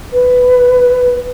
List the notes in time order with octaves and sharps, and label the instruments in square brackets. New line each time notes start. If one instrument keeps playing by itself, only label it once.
[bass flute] B4